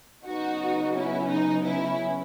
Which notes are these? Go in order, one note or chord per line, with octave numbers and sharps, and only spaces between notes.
C#3 F#3 B3 D#4 F#4
C#4 E4
D#4
C#4 E4